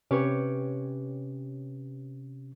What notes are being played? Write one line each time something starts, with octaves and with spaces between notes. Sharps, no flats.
C3 C#4 G4 B4 C#5